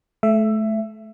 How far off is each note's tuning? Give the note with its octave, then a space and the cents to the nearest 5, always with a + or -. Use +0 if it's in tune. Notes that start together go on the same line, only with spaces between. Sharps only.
A3 -30 E5 +15